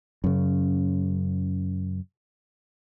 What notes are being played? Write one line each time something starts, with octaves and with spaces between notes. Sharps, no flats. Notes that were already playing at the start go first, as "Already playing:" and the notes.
F#2 C#3